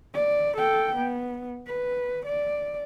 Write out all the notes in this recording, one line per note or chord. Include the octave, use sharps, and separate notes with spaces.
D5
A4 G5
B3
B4
D5